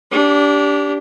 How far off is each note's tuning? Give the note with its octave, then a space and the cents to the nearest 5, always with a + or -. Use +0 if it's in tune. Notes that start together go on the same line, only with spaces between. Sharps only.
D4 -25 G4 +0